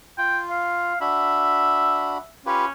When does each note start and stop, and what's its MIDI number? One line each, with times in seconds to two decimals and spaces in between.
0.18 0.93 65
0.18 0.39 79
0.50 0.98 77
1.01 2.18 62
1.01 2.18 66
1.01 2.31 76
1.01 2.18 83
2.46 2.71 61
2.46 2.65 65
2.46 2.65 67
2.46 2.65 71